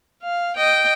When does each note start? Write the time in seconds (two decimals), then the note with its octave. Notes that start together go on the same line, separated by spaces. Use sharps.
0.23 F5
0.57 D#5 G5